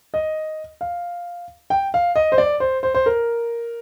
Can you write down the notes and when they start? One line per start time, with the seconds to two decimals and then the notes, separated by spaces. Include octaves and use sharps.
0.14 D#5
0.81 F5
1.70 G5
1.94 F5
2.16 D#5
2.32 C5
2.38 D5
2.60 C5
2.83 C5
2.95 C5
3.06 A#4